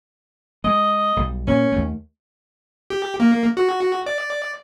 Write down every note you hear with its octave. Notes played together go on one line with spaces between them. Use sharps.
G#3 D#5
B1 G3
A#2 C#4
D#2 A3
G4
A#3
F#4
D5